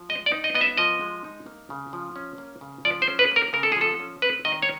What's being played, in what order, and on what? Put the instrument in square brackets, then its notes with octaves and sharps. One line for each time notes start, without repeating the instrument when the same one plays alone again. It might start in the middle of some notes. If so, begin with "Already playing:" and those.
Already playing: [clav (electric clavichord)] F3
G#3 D#5
D5
D#4
D#5
B3 D#5
E5
F3 D#5
G#3
D#4
A#3
C#3
F3
C#4
A#3
C#3
F3 D5
C5
C#4
B4
A#3 A#4
C#3 A#4
A4
G#4
F3 A4
C#4
C4 B4
D#3 D#5
C#5